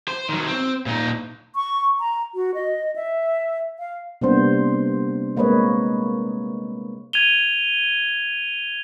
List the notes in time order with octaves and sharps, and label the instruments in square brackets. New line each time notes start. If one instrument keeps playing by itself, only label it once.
[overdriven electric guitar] C5
D#3 F#3
C4
A#2 D#4
[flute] C#6
A#5
F#4
D#5
E5
F5
[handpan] C3 G3 A#3 B3 D4 C5
G#3 A#3 C4 B4 C#5 D#5
[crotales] G#6 D#7 F7 G7